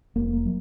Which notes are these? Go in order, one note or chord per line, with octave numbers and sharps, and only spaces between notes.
F1 A#3
A#3
F#3